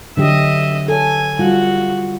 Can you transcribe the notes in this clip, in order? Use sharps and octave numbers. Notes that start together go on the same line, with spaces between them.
D3 F#3 G4 D#5 E5
A4 C#5 G#5
G3 F4 F#4